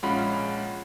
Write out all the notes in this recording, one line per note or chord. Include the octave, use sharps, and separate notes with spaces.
A#1 G#3 C#4 F4 F#5 B5